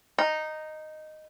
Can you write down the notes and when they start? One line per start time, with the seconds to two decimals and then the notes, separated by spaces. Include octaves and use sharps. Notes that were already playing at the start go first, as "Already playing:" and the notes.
0.19 D#4